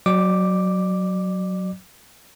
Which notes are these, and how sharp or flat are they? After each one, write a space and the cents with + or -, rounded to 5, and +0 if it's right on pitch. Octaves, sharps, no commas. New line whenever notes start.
F#3 +0 D5 +40 D6 +0